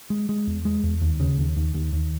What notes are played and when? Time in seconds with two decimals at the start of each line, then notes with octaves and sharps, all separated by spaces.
0.10 G#3
0.29 G#3
0.47 E2
0.65 G#3
0.84 E2
1.01 D#2
1.20 C#3
1.38 D#2
1.57 D#2
1.74 D#2
1.93 D#2